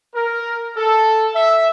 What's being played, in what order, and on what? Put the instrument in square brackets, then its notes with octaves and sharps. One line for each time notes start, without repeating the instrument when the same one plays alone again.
[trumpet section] A#4
A4
E5